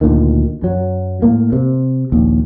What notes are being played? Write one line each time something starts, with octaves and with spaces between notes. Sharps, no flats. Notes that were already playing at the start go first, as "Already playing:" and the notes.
D2 A#2 D#3
F#2 F#3
A2 A#3
C3
A#1 D#2